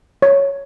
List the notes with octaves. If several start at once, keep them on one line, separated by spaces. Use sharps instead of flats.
C#5